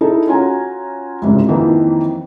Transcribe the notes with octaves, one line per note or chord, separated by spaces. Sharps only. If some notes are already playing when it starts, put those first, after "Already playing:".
D#4 E4 G#4 A4
C#4 F4 F#4 G#5 A#5
C2 F2 G#2 C#3
F2 D#3 E3 A#3